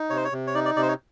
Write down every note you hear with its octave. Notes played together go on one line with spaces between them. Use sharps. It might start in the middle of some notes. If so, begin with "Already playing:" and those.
Already playing: D#4
C3 C#5
C5
C#5
C3
C#5
D#4 D5
D5
C3 D5
C5
C#5